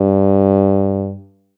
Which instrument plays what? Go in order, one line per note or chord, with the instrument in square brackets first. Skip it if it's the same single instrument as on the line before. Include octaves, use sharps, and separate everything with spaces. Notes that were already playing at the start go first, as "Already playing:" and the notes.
Already playing: [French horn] G2